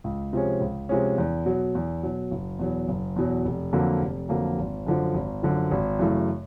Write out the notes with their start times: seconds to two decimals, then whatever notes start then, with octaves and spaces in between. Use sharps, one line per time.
0.04 C#2
0.33 C3 F3 G#3 C#4
0.61 C#2
0.89 C3 F3 G#3 C#4
1.18 E2
1.46 B2 F#3
1.75 E2
2.03 B2 F#3
2.31 F#1
2.59 E2 B2 F#3
2.88 F#1
3.16 E2 B2 F#3
3.45 F1
3.73 F2 D3 F#3 A#3
4.01 F1
4.29 F2 D3 F#3 A#3
4.58 G#1
4.86 F#2 D3 F3
5.14 G#1
5.43 F#2 D3 F3
5.71 G#1
5.99 F#2 C#3 E3 A3